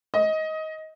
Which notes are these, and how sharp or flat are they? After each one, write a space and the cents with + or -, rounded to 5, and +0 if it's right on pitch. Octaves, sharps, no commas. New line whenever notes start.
D#5 +20